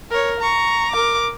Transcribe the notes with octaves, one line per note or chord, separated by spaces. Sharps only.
A#4 C#5
A#5 C#6
A#4 D6